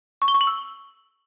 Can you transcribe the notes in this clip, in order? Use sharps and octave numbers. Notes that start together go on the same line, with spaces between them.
C#6
G7
C#6
F#7
E6